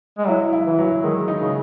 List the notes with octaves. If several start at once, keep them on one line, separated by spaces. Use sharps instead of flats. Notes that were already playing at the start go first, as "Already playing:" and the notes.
G#3
F#3 E4
E4
E3
F#3
D#3 G#3
D#4
C#3